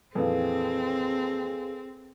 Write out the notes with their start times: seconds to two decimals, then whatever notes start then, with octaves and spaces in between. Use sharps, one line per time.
0.15 F2 A#2 E3 C4 G#4 A4 B4 F5